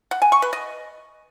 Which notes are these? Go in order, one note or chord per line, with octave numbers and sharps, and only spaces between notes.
F#5
G#5
C#6
B4
D#5